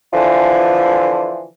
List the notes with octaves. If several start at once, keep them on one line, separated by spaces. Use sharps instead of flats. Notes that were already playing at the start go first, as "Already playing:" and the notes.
D3 E3 F3